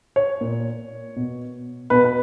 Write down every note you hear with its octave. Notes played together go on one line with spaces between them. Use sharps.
C#5
A#2
B2
B2 B4
B4